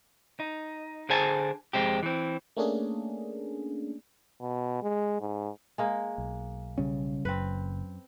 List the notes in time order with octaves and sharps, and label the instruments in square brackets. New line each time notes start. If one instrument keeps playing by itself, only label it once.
[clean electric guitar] D#4
D3 G#4 C5 G#5 A5
F2 G#3 C4 G4
E3 C4
[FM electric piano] A3 A#3 C#4 D4 G#4
[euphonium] B2
G#3
G#2
[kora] G#3 A#3
[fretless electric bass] B1
[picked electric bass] C#3 G3 C#4
[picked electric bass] F#1 [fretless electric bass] F#2 [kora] C4 B4